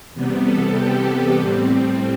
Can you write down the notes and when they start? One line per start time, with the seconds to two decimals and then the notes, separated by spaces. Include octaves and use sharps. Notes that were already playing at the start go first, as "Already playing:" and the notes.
0.14 E2 C3 G3 B3
0.45 A4
0.77 G4
1.39 A2 G3 C4